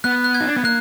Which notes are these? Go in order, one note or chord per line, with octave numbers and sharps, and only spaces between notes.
B3 F#6
F#6
G#6
D#4
D4
B3
A#3 F#6